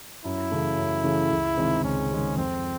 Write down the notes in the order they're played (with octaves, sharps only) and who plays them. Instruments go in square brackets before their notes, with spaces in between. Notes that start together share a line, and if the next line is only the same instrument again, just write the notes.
[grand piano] F#2 [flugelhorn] E4
[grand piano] C#3 E3 A3
F#2
C#3 E3 A3
C#2
C3 D#3 G#3
[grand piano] C#2 [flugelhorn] C#4
[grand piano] C3 D#3 G#3
[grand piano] F2 [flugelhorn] C4